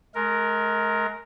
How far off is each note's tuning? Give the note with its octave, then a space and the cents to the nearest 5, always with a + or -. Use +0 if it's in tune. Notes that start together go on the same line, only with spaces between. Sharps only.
G#3 +40 A#4 +0